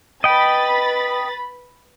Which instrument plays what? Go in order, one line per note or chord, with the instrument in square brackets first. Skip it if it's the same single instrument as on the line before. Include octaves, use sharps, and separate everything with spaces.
[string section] B4 B5 A6 [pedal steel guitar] D#5 G5